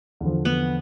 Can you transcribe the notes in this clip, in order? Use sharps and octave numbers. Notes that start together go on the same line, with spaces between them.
E2 D3 F3
B3